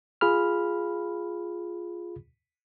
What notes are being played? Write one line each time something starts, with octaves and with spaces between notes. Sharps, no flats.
F4 G#4 B5 F6